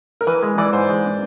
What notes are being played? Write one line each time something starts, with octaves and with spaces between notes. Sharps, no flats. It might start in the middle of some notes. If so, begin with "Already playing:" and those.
A#4
E3 B4
G#3
E3 D5
G#2 C5
G#3